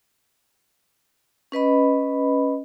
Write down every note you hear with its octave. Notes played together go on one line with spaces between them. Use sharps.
C#4 B4 D#5 B5